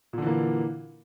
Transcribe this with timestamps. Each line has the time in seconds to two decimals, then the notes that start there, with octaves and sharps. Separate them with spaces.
0.13 A#2
0.18 D3
0.22 E3
0.27 A#3